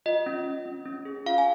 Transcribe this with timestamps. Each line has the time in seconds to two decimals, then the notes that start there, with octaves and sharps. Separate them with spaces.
0.06 F4 D#5
0.26 C#4
0.46 C#4
0.66 C#4
0.85 C#4
1.05 G#4
1.26 F4 F5
1.38 G#5